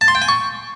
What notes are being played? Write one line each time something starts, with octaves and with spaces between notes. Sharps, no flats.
A5
C6
G5
G#5
C#6